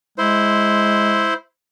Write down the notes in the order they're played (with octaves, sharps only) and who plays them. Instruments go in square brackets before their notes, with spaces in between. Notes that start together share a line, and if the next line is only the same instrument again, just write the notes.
[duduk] G#3 [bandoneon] E4 C5